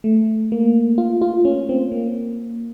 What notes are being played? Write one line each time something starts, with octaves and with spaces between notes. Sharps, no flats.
A3
A#3
F4
F4
C#4
C4
A#3